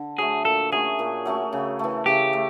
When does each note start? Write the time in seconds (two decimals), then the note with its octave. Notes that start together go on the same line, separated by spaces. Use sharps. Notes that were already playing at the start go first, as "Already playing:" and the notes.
Already playing: D3
0.18 F#3 A3 G#4
0.45 A#2 A4
0.72 F#3 A3 C#4 G#4
0.99 A#2
1.26 F#3 A3 C#4
1.53 C#3
1.79 E3 A3
2.06 C#3 G4
2.33 A3